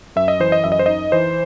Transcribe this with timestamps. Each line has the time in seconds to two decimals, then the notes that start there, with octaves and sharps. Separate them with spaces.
0.16 F#2 E5
0.28 D#5
0.40 E3 C5
0.52 D#5
0.64 F#2 E5
0.72 D#5
0.79 C5
0.86 D#4 D#5
1.12 E3 C5